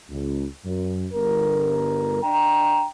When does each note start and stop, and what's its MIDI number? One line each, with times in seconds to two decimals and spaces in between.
0.10 0.46 37
0.65 1.07 42
1.13 2.22 31
1.13 2.22 70
2.23 2.87 62
2.23 2.87 79
2.23 2.87 82